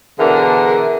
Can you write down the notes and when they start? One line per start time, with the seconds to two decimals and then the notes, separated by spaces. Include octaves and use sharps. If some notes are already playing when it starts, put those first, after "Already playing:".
0.19 B2 D3 E3 D4 G#4 A#4